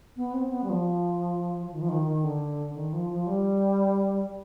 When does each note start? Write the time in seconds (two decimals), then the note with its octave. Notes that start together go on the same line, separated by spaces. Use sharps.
0.16 B3
0.34 C4
0.51 B3
0.64 G3
0.69 F3
1.71 D#3
1.81 F3
1.89 D#3
2.06 D#3
2.24 D3
2.75 D#3
2.93 F3
3.09 F3
3.27 G3